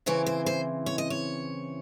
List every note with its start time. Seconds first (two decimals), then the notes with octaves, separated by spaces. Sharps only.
0.06 C#3 E3 C4 E4 C#5
0.26 C5
0.46 C5
0.86 C#5
0.98 D#5
1.10 C#5